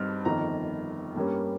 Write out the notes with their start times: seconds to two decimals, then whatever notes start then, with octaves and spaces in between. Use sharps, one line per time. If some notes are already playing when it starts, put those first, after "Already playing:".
Already playing: G2 G3 C4 D#4 F6
0.25 G1 F2 D#3 A#5
1.16 G2 G3 A#3 C#4